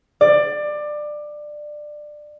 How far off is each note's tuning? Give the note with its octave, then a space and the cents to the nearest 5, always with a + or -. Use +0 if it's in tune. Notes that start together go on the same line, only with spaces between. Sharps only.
D5 +20